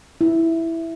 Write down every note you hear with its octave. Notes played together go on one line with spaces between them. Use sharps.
E4